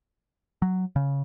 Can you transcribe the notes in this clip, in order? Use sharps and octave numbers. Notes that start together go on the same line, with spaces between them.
F#3
C#3